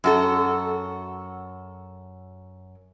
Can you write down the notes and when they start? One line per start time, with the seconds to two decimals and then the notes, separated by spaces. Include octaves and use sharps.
0.04 F#2 F#4 A4